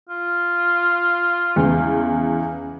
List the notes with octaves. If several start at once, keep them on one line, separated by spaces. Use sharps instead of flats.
F4
E2 C#3